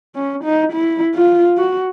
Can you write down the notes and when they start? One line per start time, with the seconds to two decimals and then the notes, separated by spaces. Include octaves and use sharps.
0.15 C#4
0.44 D#4
0.72 E4
1.15 F4
1.58 F#4